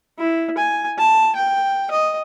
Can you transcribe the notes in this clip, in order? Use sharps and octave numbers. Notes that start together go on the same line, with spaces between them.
E4
G#5
A5
G5
D#5